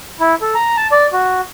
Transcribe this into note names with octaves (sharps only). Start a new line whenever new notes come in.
E4
A4
A#5
A5
D5
F#4